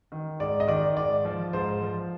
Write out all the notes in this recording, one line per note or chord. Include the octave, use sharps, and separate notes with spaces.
D#3
G#2 D5
D#5
D#3 D5
G#2 D5
F3
G#2 C5
F3